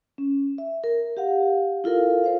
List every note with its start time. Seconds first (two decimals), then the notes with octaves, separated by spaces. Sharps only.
0.18 C#4
0.58 E5
0.84 A#4
1.17 G4 F5 F#5
1.84 E4 F4 A4 A#4 F5
2.24 A#4 C5 F5